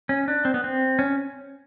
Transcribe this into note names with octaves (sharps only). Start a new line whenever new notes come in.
C#4
D4
C4
B3
C4
C#4